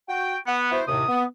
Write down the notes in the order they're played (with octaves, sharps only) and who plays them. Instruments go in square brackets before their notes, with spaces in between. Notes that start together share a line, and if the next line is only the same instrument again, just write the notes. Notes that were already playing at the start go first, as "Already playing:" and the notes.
[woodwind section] F#4 G5
[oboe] B3 [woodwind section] F#5
[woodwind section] E4 F#4 C5
[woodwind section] D#2 A2 C3 [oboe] D#6
[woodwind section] B3